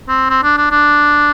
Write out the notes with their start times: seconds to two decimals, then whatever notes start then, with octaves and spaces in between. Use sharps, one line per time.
0.09 C4
0.30 C4
0.43 D4
0.57 D4
0.71 D4